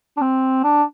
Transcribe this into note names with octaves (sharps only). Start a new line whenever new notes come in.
D4
C4
D4